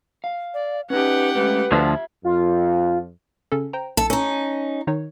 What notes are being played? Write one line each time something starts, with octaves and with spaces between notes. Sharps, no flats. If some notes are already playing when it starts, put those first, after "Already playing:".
F5
D5
C#4 D#4 G4 B4 F#5
G#3 A3 C#4 B4
D2 D3 F3 F4 E5
F2 F4
C#3 C#4 A4
C5 G5 A#5
B1 A4
C#4 D#4 A4
D#3 D#4 C#5